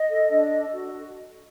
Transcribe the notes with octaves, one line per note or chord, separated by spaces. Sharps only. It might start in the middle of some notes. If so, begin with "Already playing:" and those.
Already playing: D#5
A4
D4
A4
F#4